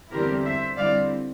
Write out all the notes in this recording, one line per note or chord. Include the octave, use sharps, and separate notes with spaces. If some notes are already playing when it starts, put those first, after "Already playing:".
E2 D3 G3 C4 E4 G4 A#4
C5 E5
D3 G3 C4 E4 D5 F5